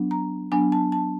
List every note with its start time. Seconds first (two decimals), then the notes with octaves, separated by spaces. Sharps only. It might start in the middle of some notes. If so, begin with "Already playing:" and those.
Already playing: F#3 B3 D4
0.11 A#5
0.52 F#3 B3 D4 G#5
0.72 A5
0.92 A5